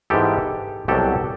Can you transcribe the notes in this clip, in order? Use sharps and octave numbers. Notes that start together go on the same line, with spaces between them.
G#2 E3 G#3 B3 E4 G4 A4
C2 B2 F#3 G4 A4